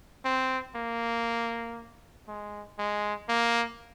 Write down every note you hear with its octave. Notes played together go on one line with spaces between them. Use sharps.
C4
A#3
G#3
G#3
A#3